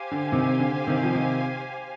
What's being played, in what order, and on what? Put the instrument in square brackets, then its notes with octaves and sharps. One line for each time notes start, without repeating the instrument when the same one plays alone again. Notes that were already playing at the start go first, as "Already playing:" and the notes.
Already playing: [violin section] G4 C5 F5 G#5
[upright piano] D3
C3 D#3
D3
C3 D#3
F3
C3 D#3